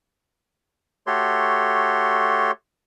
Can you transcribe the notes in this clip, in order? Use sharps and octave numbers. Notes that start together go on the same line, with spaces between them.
A3 F#4 G4 A4 C#5 C6